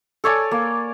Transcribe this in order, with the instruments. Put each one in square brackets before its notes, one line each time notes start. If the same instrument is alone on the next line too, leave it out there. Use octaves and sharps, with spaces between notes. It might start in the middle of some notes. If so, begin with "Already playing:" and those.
[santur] A4 C#5 D5 G#5
A#3